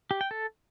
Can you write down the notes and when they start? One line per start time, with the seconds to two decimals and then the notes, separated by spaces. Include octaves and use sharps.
0.11 G4
0.21 G5
0.31 A4